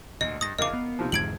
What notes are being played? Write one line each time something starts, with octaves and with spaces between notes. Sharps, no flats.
D2 A#2 D#5
G2 D#6 A#6
E2 C#3 A#4 D#5 F5 D6
B3
C3 D#3 F3
E2 G#2 D3 G#6 D7 F#7